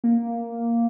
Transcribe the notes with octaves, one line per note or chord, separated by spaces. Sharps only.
A#3